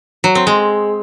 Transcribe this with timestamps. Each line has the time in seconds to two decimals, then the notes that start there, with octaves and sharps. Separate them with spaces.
0.24 F#3
0.35 C4
0.47 G#3